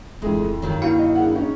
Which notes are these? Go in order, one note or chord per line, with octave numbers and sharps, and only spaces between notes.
D1 F2 E3 G#3 A3
G2 D#3 F#3
A#3 E4 F#4 F5 C#7
D#5
D4 G#4 F#5
G#3 C#4 D#4